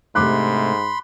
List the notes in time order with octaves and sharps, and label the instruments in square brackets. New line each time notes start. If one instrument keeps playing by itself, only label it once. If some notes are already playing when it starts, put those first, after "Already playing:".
[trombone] G#2 [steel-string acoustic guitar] C3 A3 D4 [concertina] B5 C6 [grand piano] D6 F#6